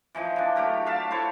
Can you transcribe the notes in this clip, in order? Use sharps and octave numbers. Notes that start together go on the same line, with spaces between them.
E3 F3 D#4
E3 D4
F#3 A3 G4 A#4
E5 F5 A5
E4 A4 C5 C#5